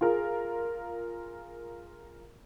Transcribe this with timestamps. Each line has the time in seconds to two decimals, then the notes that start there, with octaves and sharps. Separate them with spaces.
0.01 F4 G#4 A#4